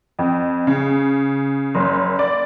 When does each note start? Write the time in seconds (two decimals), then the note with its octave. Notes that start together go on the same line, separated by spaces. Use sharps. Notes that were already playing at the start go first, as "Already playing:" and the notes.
0.19 F2
0.67 C#3
1.75 F#1
2.19 D5